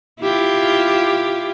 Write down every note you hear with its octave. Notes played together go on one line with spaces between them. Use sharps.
E4 F4 G4